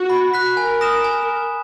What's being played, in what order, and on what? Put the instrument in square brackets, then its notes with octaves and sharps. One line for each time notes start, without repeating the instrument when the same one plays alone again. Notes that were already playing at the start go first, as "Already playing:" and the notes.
Already playing: [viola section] F#4
[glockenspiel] B5
F#6 B6
[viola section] A#4 [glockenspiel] G#5
[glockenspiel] D#6 A#6 E7
G#5